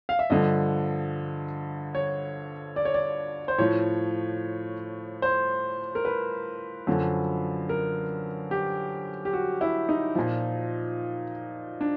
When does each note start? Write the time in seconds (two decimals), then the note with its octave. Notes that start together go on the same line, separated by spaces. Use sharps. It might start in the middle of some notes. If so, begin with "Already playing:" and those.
0.09 F5
0.19 E5
0.30 G2 D3 F3 D#5
1.95 C#5
2.76 D5
2.85 C#5
2.94 D5
3.48 C5
3.58 A2 F3 C#5
5.22 C5
5.95 A#4
6.05 B4
6.87 F#2 D3 F3
7.69 A#4
8.51 G4
9.25 G4
9.33 F#4
9.61 E4
9.89 D#4
10.15 A#2 F3
11.81 D4